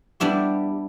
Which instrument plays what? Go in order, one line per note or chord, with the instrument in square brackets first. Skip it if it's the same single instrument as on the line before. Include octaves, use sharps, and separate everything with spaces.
[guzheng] G3 B3 D4 E4 G4